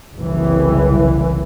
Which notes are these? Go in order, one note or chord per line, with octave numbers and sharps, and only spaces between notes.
F#1 C2 E3